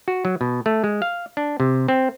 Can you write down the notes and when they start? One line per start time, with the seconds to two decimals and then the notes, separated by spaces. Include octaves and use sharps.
0.08 F#4
0.25 F#3
0.41 B2
0.66 A3
0.84 G#3
1.02 F5
1.37 D4
1.60 C3
1.88 C4